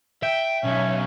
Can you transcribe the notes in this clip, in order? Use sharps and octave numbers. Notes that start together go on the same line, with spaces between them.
E5 G5
B1 C#4